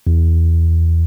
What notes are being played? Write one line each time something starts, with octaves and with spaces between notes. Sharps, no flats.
E2